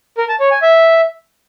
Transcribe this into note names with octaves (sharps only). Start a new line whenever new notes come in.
A#4
A5
C#5
G#5
E5